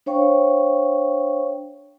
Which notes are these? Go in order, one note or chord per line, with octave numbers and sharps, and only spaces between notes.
D4 C5 C#5 F5 G5 C#6